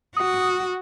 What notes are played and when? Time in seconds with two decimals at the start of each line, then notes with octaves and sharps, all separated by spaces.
0.17 F#4 D#6